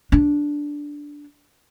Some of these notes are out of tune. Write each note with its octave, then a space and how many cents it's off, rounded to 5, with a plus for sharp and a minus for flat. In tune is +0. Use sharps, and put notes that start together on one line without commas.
D4 -5